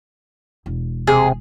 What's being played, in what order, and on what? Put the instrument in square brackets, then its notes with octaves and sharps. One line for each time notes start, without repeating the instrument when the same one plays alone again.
[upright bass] E1
[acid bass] C3 [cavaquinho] G#4